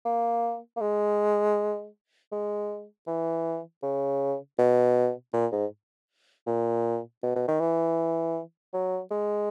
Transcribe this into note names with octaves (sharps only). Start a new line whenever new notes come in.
A#3
A#3
G#3
G#3
E3
C#3
B2
A#2
G#2
A#2
B2
B2
D#3
E3
F#3
G#3